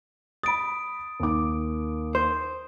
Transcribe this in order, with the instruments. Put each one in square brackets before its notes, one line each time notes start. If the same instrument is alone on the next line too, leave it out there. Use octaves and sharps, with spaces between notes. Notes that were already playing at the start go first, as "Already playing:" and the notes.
[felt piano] B5 A6 [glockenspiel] D#6 D7
[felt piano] D#2 D6
[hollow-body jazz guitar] C5